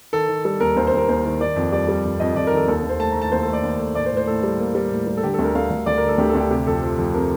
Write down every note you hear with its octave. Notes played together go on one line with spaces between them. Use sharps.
D#3 A4
D#3
G3 A4
D#2 A#4
D#2 C5
C5
D#2
A#4
D#2 C5
D#3
D#3 D5
F2
G3 D5
G3
F2
F2 D#5
F2 D5
A#4
D#3 A4
D#2 A4
A4
D#2
C5
A3 A5
A#5
A3
A5
D#2 C5
A4
A3
D5
D#2
A3
A2 D5
C5
A2
C5
A2 A4
G3
A#3
G3
A2
G3
A4
D3 G4
A4
D2
A#4
D2 F5
D2
D2 D5
A#4
D3
A4
D2 G4
A4
D2
G4
C3 G4
F2 A4
F3
F2
C3 A#4